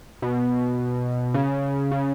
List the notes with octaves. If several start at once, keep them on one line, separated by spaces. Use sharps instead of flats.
B2
C#3
C#3